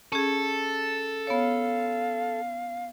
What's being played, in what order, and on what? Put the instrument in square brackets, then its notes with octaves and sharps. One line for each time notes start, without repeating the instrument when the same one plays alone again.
[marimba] C#4 G#4 [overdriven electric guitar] A4
[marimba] B3 C#5 [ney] F5